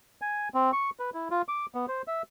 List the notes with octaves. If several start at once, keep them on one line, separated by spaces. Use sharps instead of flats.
G#5
C4
C#6
B4
E4
F4
D6
B3
C5
E5